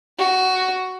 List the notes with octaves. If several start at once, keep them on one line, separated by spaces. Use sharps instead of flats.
F#4